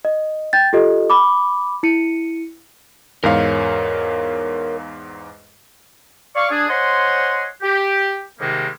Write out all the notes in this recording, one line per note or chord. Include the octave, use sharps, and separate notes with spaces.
D#5
G5 G6 A6
F4 G4 A4 D#5
B5 D6
E4 C#7 D#7
E2 G#2 A#4 C#5 F5
D5 F5 C#6
D4 G#4
C5 C#5 D#5 F#5 G#5 C6
G4
G#2 C3 D#3 G3 G#3 A#3